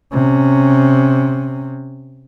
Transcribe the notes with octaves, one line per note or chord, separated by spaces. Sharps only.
C3 C#4